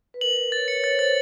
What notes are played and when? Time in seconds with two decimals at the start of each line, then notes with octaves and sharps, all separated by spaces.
0.14 B4
0.21 A#4 F#7
0.37 F#7
0.52 C#5 A6
0.68 C#5 C#7
0.79 C#5
0.84 A6
0.92 C5
0.99 C#5 A6